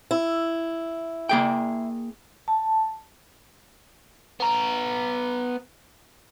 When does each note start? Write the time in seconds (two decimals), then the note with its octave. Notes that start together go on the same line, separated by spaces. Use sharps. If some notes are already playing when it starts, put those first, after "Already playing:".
0.11 E4
1.29 A#3 G#4 G5
2.48 A5
4.40 B3 A#5